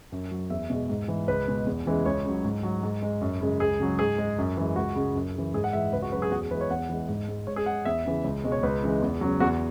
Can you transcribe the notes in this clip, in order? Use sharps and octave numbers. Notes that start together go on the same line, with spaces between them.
F#2
F#3
E2 E5
B2 G#3
G#2
E3 G#3
C#2 B4
B2 G#3
E2
C#3 E3 G#3
C#2 C#5
C#3 F#3
G#2
F#3
G#2
G#3
F#2
C#3 G#3
C#2 G#4
C#3 F#3
G#2 G#4
G#3
F#2
E3 G#3
C#2 F#4
C#3 G#3
F#2
C#3 E3
G#2 G#4
F#5
E3 G#3 E5
C#2 B4
F#4
C#3 F#3 B4
G#4
E2 F#4
G#4
E3 G#3 B4
C#5
E2 F#5
E3 G#3
G#2
G#3
G#2 C#5
G#4
G#3 F#5
E2 E5
C#3 E3
C#2
B2 G#3
C#5
C#2 B4
C#3 E3 G#3
E2
C#3 F#3
E2 F#4